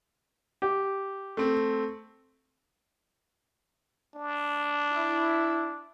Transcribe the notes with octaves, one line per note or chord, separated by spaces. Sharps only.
G4
A3 C4
D4
E4